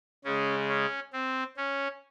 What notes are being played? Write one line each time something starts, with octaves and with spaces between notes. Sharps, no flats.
C#3 G#3 C#4
C#4
C4
C#4